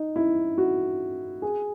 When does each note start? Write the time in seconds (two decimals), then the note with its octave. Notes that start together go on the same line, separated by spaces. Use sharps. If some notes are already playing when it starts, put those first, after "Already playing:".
Already playing: D#4
0.16 E4
0.58 F#4
1.42 G#4